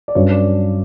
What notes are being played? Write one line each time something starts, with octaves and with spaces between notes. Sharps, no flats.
D5
G2 F#3 C#4 C#5
D5